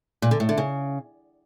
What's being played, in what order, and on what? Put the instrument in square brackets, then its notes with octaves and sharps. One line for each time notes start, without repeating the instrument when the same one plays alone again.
[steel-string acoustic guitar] A#2
D3
A2
D3
C#3